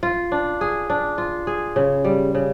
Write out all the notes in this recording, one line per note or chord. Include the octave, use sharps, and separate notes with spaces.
F4
D4
G#4
D4
F4
G#4
C#3
G3
C#3